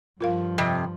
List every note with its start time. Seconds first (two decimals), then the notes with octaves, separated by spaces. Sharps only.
0.21 G2 F3 F4 A#4 F5
0.58 F2 C3